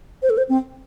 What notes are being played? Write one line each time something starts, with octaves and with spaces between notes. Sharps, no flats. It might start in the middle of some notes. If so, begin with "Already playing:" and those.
C5
A4
C5
C4